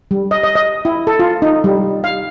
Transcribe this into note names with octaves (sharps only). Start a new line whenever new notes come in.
G3
D#5
D#5
D#5
E4
A4
F4
D#4
G3
F5